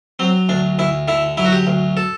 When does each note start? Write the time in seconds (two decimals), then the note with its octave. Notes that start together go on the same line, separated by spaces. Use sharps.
0.19 F#3 C4
0.49 D2 D4
0.79 D2 E4
1.08 D3 E4
1.37 F#3 E4
1.45 F#4
1.52 G4
1.67 D2
1.97 A4